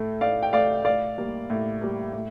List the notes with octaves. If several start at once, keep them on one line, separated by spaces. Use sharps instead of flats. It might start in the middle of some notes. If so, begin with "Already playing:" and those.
Already playing: A2 A3
A2 D5 F5
G5
A3 D5 F5
A2 D5 F5
G3 A#3
A2
G3 A#3
A2